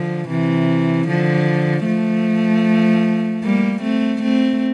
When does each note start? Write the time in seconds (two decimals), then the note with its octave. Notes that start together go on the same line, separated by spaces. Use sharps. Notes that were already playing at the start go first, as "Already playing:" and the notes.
Already playing: D3 F3
0.28 C3 E3
1.08 D3 F3
1.86 F3 A3
3.44 G3 A#3
3.82 A3 C4
4.22 A3 C4